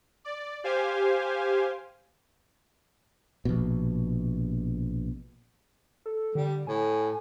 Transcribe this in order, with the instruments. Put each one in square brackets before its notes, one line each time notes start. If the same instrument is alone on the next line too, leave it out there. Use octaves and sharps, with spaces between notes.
[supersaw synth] D5
G4 C5 F5 G#5
[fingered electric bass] A#1 B2
[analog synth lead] A4
[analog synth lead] D3 [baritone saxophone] G3
[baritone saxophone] A2 [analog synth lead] G#5